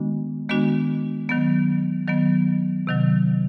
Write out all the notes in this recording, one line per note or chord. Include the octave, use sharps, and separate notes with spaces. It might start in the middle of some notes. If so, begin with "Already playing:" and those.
Already playing: D#3 G#3 B3 D4 F#4
D#3 G#3 B3 D4 F#4
D#3 F#3 B3
D#3 F#3 B3
C3 D#3 F#3